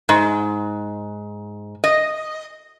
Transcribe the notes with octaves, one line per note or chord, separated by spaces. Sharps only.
G#2
D#5